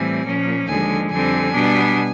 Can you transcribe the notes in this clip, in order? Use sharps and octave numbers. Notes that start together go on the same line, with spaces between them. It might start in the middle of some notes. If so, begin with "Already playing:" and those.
Already playing: A2 E3 G3 C4 G#5
A#2 F3 A#3 C#4
D#2 D3 F3 G#3 G#5
F2 D3 G3 C4 G#5
B2 G3 B3 D4